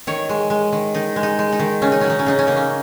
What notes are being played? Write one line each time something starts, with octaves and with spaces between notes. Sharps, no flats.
D#3 C#5
G#3
G#3
D#3
D#3 D#4
G#3
D#4
G#3
D#4
D#3
C#3 C#4
D#4
F#3 C#4
D#4
C#4
C#3 D#4
C#4
A#3 D#4
C#4